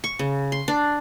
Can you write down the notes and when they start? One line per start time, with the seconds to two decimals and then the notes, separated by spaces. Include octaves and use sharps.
0.04 C#6
0.19 C#3
0.52 C6
0.68 D4